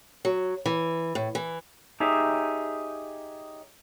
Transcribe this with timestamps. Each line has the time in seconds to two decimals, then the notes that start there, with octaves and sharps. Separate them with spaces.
0.25 F#3
0.66 E3
1.15 A2
1.35 E3
2.00 D#4 G4 G#4 C#5 E5